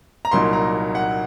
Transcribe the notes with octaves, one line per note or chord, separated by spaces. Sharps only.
A#5
C2 A#2 F#3 A#3 D#4 C6
A#5
F#5